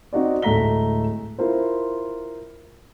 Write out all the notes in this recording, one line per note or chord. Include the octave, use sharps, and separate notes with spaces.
C4 D#4 F#4 D5
D1 G#3 A3 A#5 B6 G7
E4 F4 A#4 C5